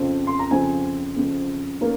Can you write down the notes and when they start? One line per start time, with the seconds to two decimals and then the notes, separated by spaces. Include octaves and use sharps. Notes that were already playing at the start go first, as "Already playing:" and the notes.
Already playing: F2 C#3 F3 C4
0.27 C6
0.39 A#5
0.51 F2 C#3 F3 C4 G#5
1.16 F2 C#3 F3 C4
1.81 D#3 A#3 C#4 A#4